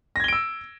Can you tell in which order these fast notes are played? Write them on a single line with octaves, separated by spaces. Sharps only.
A#6 G#6 G7 D7 E6